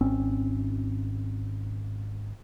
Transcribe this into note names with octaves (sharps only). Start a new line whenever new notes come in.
G#1 C4 C#4